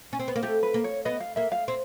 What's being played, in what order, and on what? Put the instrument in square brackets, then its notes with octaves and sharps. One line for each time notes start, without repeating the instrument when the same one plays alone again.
[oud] C#4
C4
B3
A#3
[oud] A3 [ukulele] G4
[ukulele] B4
[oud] A#3
[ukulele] C#5
[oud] B3 [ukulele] D#5
[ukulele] F5
[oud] A#3 [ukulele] E5
[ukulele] F5
[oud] C4